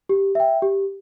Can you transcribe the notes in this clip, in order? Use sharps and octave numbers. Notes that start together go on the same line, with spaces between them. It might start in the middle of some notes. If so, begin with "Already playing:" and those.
G4
E5 G5
G4